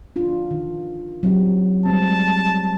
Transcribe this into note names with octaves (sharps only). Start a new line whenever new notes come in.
D4 F4
D#3
F#3 C4 G4
G3 G#3 C4 A5